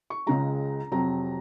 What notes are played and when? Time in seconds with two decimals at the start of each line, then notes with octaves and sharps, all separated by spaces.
0.10 C#6
0.26 C#2 C#3 G#3 A#5
0.92 F2 C3 F#3 A#5